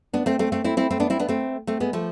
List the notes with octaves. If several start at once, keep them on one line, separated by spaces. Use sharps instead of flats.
B3 D4
A3 C4
A3 C4
A3 C4
C4 E4
C4 E4
A3 C4
B3 D4
C4 E4
B3 D4
A3 C4
A3 C4
G#3 B3
F3 A3